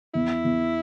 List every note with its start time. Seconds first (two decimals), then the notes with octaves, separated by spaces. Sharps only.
0.14 E2 E4
0.45 E2